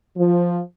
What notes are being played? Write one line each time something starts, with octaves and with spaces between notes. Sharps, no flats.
F3